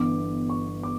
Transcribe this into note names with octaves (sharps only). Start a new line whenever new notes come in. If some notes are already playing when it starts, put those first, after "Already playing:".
Already playing: G1 G2 E3 B3 D6
C#6
D6